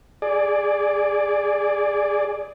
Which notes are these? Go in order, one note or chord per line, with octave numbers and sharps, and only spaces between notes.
G#4 D5